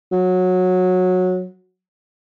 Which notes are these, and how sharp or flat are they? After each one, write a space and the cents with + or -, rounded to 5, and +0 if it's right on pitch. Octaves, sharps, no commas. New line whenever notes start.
F#3 -15